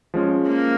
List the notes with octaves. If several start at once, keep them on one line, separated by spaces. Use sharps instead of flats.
F3 G#3 C#4
A#3